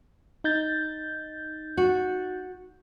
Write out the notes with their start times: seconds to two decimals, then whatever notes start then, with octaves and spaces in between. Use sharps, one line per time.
0.44 D#4 G6 A6
1.77 F#4